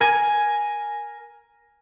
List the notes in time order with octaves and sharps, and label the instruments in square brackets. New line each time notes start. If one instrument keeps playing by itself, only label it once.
[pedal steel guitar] A#4 G#5